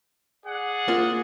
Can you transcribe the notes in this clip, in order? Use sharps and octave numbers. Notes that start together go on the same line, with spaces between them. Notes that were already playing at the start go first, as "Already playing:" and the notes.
G#4 D5 F#5
A#3 F4